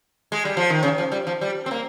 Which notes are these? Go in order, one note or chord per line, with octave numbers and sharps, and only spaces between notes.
G#3
G3
F3
D#3
C#3
F3
G3
F3
G3
C4
A#3